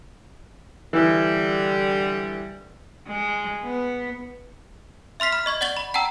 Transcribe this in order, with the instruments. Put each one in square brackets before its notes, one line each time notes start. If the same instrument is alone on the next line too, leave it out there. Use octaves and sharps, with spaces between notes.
[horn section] D3 G3 [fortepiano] E3
[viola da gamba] G#3
B3
[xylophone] E5 C6 F6 B6 C7
B5 F6
D#5 C#6 G#6
D5 F#5 C#6 A6 F#7 G7
B5
F#5 G5 A5 A#5 E6